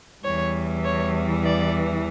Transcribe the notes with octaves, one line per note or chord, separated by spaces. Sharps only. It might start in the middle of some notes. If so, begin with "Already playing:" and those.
E2 E3 G3 C#5
C#5
D5